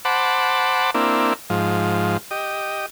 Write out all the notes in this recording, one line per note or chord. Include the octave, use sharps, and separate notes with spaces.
C5 F#5 A5 B5 D6
A#3 C4 D4 E4
G#2 F3
G4 D#5